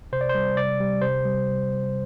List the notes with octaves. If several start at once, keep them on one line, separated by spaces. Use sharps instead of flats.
C3 C5
D5
C5
G3
C3 D5
G3
C3 C5
G3